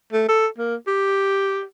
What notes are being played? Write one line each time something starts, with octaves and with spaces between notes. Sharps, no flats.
A3
A4
A#3
G4